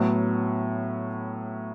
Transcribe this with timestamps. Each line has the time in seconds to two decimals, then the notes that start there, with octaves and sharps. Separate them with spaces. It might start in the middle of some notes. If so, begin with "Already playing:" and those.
Already playing: A2 F#3 B3